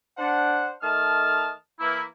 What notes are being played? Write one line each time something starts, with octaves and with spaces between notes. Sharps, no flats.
D4 C5 F#5
D#3 A3 D#5 A5 F6
E3 A#3 E4